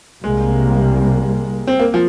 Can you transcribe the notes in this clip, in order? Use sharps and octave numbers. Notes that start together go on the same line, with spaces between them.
C2 C3 G3 G#3 A#3
C4
A#3
F3